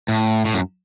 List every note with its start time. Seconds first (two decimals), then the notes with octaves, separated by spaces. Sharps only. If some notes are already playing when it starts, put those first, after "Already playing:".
0.08 A2
0.45 A2
0.54 F#2